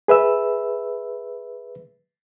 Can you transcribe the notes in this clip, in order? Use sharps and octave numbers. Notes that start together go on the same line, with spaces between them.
G#4 B4 E5 E6